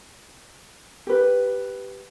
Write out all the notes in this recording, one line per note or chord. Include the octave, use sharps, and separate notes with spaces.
G4 B4